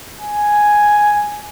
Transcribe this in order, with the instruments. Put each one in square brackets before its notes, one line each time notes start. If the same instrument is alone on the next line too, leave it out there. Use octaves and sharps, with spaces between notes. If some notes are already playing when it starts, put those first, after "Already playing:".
[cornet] G#5